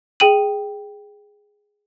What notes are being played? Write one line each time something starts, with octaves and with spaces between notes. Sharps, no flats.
G#4 G5 D#7 F#7